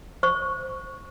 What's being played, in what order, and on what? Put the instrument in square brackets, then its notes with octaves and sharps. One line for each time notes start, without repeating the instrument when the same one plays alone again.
[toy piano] C5 C#6